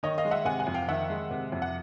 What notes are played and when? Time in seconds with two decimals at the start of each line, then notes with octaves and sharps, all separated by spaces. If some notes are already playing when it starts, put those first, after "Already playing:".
0.03 D#3 C#5 D#5
0.18 D#5 F5
0.25 G#3
0.31 E5 F#5
0.45 C3 F#5 G#5
0.59 F#5 G#5
0.67 F2
0.74 F5 G5
0.88 D#3 E5 F#5
1.10 G#3
1.30 C3
1.52 F2
1.62 F#5